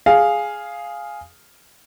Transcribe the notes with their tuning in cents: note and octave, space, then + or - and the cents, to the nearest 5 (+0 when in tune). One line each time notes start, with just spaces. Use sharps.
G#4 +0 F5 +0